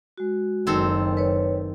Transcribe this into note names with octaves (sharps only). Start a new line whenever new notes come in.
G#3 F#4
F#1 D#3 C4 A4
B4 C#5